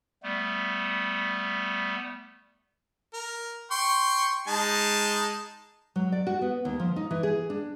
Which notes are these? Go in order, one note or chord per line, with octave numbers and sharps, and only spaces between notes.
G3 A3 B3
A#4
G5 C6 C#6
G#3 D#4 A5
F#3
D5
F#4
B3
D#2
F3
D#4
E3
G#4
D4